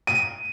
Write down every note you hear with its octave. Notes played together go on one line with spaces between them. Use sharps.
D#7